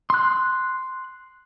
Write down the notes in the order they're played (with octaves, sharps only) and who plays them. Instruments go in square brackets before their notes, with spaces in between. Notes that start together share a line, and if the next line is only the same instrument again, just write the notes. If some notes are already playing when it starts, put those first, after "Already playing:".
[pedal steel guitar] C6 F#6